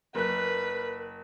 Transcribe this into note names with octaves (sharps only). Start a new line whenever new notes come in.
F#1 A#4 B4 F#6